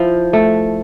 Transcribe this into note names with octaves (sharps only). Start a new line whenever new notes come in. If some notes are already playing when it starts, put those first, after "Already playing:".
Already playing: F3 E4
A3